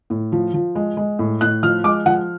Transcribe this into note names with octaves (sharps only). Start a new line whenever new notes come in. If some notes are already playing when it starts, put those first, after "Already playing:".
A2
F3
F3
G#3
G#3
A2
A2 F#6
F3 F6
G#3 D6
F3 F#5